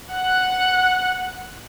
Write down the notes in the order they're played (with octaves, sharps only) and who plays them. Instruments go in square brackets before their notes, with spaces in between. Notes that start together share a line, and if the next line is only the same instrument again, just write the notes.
[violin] F#5 F#6